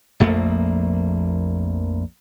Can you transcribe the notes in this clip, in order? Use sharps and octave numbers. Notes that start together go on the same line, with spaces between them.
A#1 F2 A3 A#3